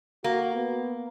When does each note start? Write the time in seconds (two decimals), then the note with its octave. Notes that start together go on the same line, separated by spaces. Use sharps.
0.24 A#3 F#4
0.55 B3